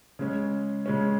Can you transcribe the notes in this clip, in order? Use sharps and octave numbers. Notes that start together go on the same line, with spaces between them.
C#3 G#3 C#4
C#3 G#3 C#4